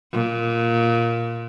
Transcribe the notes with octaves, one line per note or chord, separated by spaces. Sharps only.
A#2